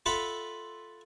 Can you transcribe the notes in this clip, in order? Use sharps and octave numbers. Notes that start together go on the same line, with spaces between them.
F4 A4 E5 F#5 B5